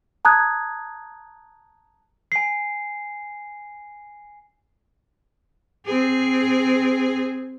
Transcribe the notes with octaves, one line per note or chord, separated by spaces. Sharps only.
A5 A#5 D#6 F#6 G#6
G#5 C7
C4 G#4